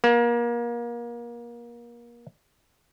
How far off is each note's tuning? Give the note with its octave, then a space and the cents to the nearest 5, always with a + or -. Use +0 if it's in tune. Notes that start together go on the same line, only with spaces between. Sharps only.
A#3 +30